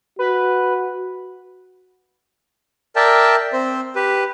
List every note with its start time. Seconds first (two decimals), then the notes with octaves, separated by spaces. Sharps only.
0.19 F#4 B4
2.96 A#4 D5 E5 G5 A5
3.53 C4 C5
3.95 G4 B4